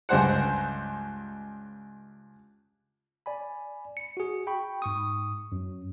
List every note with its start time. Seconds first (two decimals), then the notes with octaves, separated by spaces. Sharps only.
0.09 C#2 G2 C5 F#5
3.26 D5 G#5 B5
3.97 C#7
4.17 F#4 G#4
4.47 G5 B5 C#6
4.82 G#2 C#6 D#6
5.52 F#2